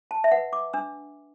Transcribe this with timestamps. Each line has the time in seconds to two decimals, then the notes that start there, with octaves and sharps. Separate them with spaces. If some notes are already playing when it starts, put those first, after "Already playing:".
0.11 A5
0.24 E5
0.31 B4 F#5
0.53 D6
0.73 D4 E6